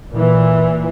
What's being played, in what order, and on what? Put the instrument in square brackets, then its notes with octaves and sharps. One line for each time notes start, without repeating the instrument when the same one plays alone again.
[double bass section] A#2 E3